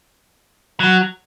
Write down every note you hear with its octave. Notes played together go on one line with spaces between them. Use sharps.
F#3